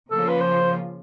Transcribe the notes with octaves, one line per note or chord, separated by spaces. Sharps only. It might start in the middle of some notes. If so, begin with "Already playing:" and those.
C#3 F3 A#3 C#4 F4 A4
B4
C5